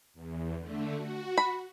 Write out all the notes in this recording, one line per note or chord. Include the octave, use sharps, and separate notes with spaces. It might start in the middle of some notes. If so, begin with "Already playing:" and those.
E2
D3 A3
F#4
B5